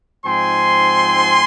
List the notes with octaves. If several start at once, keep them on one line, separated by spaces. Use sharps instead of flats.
G#2 F3 C4 D#4 G#5 C6